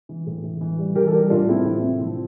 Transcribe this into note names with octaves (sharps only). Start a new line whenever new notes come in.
E3
A2
E3
E3
G3
E3 G4 A#4
A4
G3 G4 A#4
A2 D4 F4
A2 C4 E4
F3
C3
F3